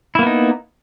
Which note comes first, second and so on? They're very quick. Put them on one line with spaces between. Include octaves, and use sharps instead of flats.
E4 A#3 B3 D#4